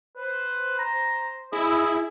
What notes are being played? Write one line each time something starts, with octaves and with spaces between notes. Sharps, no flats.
B4 C5
A#5
E4 G#4 D#5